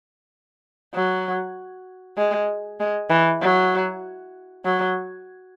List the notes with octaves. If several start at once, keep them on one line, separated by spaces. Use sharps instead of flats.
F#3
G#3
G#3
E3
F#3
F#3